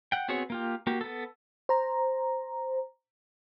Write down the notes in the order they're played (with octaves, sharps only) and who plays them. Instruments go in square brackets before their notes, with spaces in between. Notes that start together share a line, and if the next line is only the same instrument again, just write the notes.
[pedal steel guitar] F#5 G5
B3 C4 F#4 G#4 C#5
A#3 F4 G4
A#3 F#4 G4
B3 A4
[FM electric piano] C5 A#5